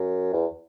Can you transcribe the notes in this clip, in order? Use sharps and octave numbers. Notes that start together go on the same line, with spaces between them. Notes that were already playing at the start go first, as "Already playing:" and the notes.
Already playing: F#2
E2